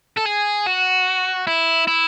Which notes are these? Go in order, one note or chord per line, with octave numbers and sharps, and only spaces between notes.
A4
G#4
F#4
E4
E4